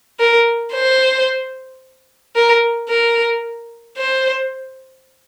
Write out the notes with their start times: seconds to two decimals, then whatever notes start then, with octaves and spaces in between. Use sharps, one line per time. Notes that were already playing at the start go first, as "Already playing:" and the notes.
0.20 A#4
0.74 C5
2.36 A#4
2.89 A#4
3.98 C5